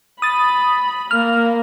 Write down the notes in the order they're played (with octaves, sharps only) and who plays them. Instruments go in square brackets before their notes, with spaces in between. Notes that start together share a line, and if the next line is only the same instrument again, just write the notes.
[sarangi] B5 [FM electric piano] D#6 A6
[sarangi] A#3 [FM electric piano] F6